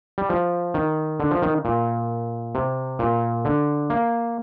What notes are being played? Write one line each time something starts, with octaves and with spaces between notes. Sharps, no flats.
G3
F3
D#3
D3
F3
D#3
A#2
C3
A#2
D3
A#3